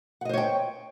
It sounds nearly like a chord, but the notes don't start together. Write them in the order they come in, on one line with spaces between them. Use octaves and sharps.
F#5 D#5 C5 C#5 G5